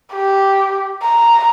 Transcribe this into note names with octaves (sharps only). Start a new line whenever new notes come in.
G4
A#5